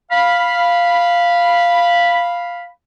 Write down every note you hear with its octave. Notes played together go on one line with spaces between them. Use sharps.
F5 B5